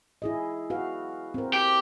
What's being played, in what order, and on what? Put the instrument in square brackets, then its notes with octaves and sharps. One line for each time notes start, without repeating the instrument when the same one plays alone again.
[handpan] E4 G#4 D#5
F#4 B4 F5
C4 A#4
[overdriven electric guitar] G4